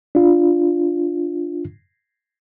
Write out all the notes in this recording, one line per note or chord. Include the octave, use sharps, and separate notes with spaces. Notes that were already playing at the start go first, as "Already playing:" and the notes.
D4 F4